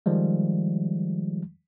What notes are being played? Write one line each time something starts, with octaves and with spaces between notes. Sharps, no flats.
D#3 F3 G3 G#3